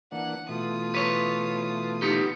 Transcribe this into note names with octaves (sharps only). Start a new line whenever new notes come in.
E3 A#3 D4 F#5
B2 E3 A3 F4 D#6
B4 C#5
B3 D#4 G4